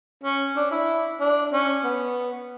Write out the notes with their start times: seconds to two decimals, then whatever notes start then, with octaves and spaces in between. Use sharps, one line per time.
0.23 C#4
0.56 D4
0.71 E4
1.20 D4
1.53 C#4
1.84 B3